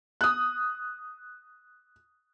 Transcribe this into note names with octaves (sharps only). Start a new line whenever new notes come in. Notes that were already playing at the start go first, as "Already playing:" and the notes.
D#6 F#6